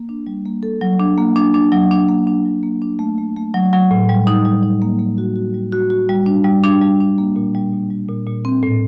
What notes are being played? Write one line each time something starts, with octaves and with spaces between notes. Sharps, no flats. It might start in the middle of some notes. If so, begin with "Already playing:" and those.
Already playing: A#3
D4
G3
A#3
A4
F#3
D4
A#3
D4
D4
F#3
D4
A#3
D4
F#3
A#3
D4
A3
A3
A3
F#3
F#3
A2
G3
D#4
G3
D#4
A#3
A#3
F#4
F#4
G3
F#4
F#4
G3
D4
G3
D4
G3
D4
A#3
A#2
G3
A#2
G3
A#2
A#2
C4
A2